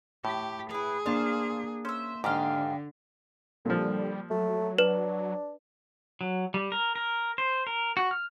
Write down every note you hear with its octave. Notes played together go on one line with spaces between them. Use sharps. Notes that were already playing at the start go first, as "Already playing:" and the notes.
A2 G4
E4 G#4 B4
A#3 D4 C5 F5 A5
C#4 C5 E5
G#2 D3 G4 D#5 F5
A#2 D3 F3 G3
F#3 A3
D4 B4 E7
F#3
G3
A#4
A#4
C5
A#4
F#4
F6